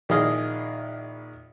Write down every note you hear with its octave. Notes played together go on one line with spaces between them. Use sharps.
A#1 D#3 E4 G#4 D#5 F5